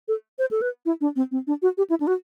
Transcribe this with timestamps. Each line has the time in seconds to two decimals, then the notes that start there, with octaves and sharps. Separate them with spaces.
0.08 A4
0.39 C5
0.51 A4
0.62 B4
0.86 E4
1.01 D4
1.16 C4
1.31 C4
1.47 D4
1.62 F#4
1.78 G4
1.90 E4
2.00 D4
2.07 F#4